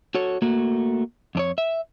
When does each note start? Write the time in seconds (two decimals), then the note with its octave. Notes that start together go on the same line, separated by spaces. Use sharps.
0.15 F#4 A4 C#5
0.42 A3 A#3 F#4
1.35 F2 D4 C#5
1.58 E5